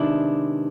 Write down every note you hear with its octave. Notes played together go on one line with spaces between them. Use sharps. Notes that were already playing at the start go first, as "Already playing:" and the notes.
Already playing: C3 D#3 G#3 B3 D4 E4